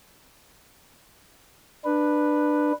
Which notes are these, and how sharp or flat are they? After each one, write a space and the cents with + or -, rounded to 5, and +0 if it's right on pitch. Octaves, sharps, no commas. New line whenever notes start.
D4 +20 B4 -5